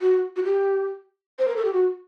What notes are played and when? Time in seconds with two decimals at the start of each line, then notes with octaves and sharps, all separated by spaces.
0.01 F#4
0.36 F#4
0.44 G4
1.39 C5
1.48 A#4
1.56 A4
1.65 G4
1.73 F#4